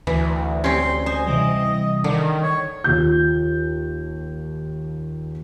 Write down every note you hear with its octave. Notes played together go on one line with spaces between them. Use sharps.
D2 E3
C4 C#4 G4 C6
C5 D#5 G#5
C3 E3 G3
D3 D#3
C#5
D#2 F4 G6